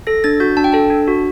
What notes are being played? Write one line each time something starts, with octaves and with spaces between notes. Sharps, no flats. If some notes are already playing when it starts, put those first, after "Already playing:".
A4 A#6
D4 A6
F#4 G6
D4 A5
G5
A4 A5
D4
F#4